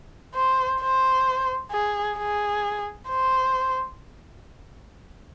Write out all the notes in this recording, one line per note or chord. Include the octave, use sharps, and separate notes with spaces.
C5
C5
G#4
G#4
C5